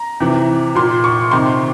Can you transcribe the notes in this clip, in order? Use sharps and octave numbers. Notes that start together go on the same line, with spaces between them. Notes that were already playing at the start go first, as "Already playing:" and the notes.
Already playing: A#5
C3 E3
A#2 C6
C#6
C3 D#3 C6